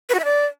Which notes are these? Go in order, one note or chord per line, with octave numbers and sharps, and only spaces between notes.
B4
F#4
E5
D5